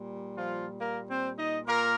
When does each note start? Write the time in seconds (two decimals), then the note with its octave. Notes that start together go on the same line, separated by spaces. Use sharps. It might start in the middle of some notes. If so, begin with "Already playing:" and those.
Already playing: A#2 G3
0.35 F3 F4
0.78 A#3 A#4
1.08 C4 C5
1.37 D#4 D#5
1.67 A#2 A#3 A#4